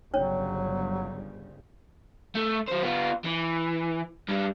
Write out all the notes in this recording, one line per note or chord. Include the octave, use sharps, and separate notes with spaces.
G1 C#3 F#3 G3 C#4 C#5
A3
F#3 C5
B3 F4
E3
G2 G3